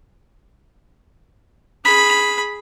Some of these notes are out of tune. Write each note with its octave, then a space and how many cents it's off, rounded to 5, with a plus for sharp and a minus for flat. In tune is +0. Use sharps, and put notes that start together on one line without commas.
G#4 +0 B5 +0